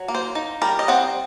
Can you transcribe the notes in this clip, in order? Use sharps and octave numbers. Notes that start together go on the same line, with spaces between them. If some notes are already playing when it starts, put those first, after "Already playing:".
Already playing: F#3
A#3
C5
D#4
G3 A#4
D#5
C4 F#5